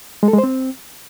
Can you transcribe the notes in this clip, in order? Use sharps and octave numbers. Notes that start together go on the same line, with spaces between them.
G#3
A4
G#3
C5
C4